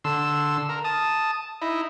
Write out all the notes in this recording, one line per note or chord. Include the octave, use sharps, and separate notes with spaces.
D3 C6 E6
A#4
A5 D#6
D#4 E4